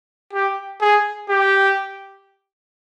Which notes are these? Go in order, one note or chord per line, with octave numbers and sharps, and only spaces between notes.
G4
G#4
G4